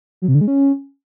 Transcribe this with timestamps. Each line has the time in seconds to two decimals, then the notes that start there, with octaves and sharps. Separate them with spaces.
0.22 F#3
0.28 C3
0.35 D3
0.41 G#3
0.48 C#4